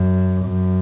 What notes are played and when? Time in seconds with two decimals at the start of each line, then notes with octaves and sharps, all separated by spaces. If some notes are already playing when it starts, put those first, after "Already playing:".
Already playing: F#2
0.45 F#2